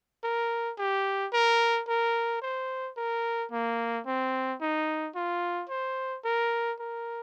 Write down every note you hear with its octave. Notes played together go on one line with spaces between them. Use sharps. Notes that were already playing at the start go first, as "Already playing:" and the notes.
A#4
G4
A#4
A#4
C5
A#4
A#3
C4
D#4
F4
C5
A#4
A#4